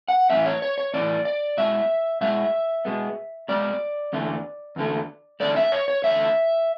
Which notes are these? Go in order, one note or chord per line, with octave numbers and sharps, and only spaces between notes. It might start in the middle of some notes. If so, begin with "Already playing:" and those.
F#5
A2 E3 B3 E5
C#5
C#5
C#5
A2 E3 B3 D5
D5
B2 G#3 E5
B2 G#3 E5
B2 G#3 B3
B2 G#3 D5
E2 D3 A3
E2 D3 A3
E2 D3 A3 D5
E5
C#5
C#5
E2 D3 A3 E5